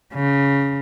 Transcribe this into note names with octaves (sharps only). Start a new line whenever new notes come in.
C#3